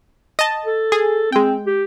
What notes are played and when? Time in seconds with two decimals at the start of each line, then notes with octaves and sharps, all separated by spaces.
0.39 D#5 A5
0.65 A4
0.92 G#4
1.32 G#3 C4 G5
1.67 G4